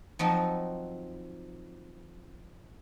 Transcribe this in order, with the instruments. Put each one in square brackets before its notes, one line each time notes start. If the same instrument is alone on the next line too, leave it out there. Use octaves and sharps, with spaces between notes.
[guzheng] F3 F#3 C4 D#4